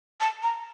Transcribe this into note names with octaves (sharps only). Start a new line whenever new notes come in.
A5
A#5